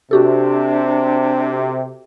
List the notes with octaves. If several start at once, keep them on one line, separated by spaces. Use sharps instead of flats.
C3 D4 F#4 G4 A4